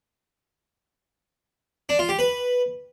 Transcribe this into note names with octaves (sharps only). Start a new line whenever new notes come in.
D4
F4
G4
B4